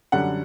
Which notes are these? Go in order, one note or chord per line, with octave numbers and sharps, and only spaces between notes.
F#2 D3 G3 F#5